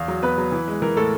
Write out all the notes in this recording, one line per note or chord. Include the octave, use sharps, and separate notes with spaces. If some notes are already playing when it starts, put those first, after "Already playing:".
Already playing: E2 F5
F#3
B3 B4
F#3
E3
G#3
E3 A#4
A2 A4